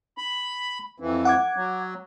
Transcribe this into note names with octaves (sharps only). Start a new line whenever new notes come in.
B5
F2 E3
F#5 D6 G#6
F#3